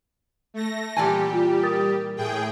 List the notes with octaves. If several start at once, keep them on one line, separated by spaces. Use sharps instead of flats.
A3 A#6
A#2 E3 G3 G4 G#5 A5
F4
A#4 D#6 A6
A2 G#4 G5